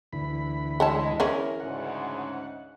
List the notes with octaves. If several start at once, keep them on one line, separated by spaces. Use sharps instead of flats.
D2 E3 B5
G#3 A4 C#5 A5
E3 C#4 G#4 A#4
D2 G#2 C#3 F#5